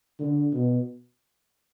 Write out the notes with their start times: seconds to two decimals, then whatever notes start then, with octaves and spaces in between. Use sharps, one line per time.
0.19 D3
0.53 B2